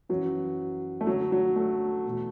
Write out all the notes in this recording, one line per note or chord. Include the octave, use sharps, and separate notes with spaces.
F#2 E3 F#3
A3
D2 D3 F#3
F#3
A3
E2 B2